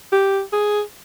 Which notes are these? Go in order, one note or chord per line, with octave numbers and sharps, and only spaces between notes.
G4
G#4